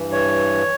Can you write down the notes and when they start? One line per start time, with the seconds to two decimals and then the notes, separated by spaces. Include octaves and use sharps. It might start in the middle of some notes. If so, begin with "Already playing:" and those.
Already playing: G2 E3
0.12 C#5